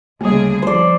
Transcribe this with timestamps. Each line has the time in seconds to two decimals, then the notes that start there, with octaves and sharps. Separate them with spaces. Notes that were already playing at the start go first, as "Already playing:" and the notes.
0.21 D2 C#3 G3 A#3 G#4
0.62 F3 C5 D5